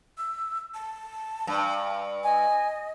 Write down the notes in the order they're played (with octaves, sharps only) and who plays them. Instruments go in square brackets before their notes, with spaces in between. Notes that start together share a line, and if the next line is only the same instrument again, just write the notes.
[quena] E6
A5
[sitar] G2
[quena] D#5 [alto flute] G#5